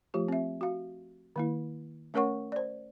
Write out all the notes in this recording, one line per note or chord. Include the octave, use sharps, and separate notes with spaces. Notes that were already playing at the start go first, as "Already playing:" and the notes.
F3 A3 F4 G4
C4 E5
F#4 F5
D#3 A#3 E4
A3 C#4 A#4 C#5 F#5 C#6
C5 D5